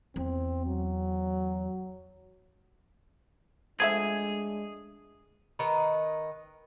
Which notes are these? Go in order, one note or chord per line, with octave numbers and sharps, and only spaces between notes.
E2 C4
F#3
F3 G#3 A3 D4 G#4 E5 G#6
D#3 A#4 B4 D#5